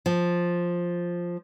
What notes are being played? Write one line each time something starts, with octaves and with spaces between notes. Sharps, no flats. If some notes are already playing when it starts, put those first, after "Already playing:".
F3